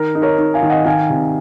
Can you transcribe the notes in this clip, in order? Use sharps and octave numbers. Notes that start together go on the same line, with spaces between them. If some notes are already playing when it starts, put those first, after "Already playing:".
Already playing: D#3 A#4
D#4
A#4 C#5
D#4
F5 G#5
D#3
D#5 F#5
D#3 F5 G#5
C3